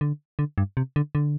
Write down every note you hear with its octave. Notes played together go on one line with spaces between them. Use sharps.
D3
D3
G2
C3
D3
D3